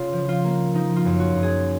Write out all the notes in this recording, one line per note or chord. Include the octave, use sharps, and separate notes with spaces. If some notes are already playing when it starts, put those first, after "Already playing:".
Already playing: C#3 F4
F3
F4
A#3
F3 D#4
F4
F#2
F#4
F#2
G#4